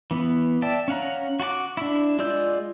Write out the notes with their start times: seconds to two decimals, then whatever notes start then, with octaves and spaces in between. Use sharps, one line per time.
0.11 E3 B3
0.62 D5 E5 G5 A5
0.88 C#4 F5 F#5 A#5
1.40 F#4 F#5 A5 D6
1.77 D4 E4
2.19 G#3 F4 D5 E6 G6